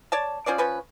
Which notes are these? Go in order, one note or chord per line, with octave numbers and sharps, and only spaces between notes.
C#5 D5 A5
F3 C#4 C5 D5
F3 C#4 B4